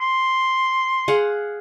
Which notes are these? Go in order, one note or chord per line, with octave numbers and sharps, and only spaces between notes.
C6
G#4 F5 F#5